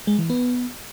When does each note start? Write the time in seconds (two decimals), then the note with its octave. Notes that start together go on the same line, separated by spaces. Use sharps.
0.07 G#3
0.18 E3
0.30 B3